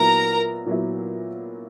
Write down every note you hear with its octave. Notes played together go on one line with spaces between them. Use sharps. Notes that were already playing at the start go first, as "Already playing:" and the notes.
Already playing: A#2 F#3 B3 E4 A#4 A#5
A#2 F#3 B3 E4